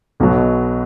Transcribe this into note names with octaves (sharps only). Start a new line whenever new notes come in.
B1 B2 F#3